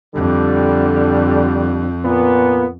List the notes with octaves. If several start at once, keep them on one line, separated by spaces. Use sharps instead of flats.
F2 D3 G3
A#2 B3